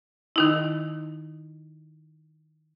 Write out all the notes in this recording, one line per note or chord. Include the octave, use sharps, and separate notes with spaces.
D#3 D#4 E4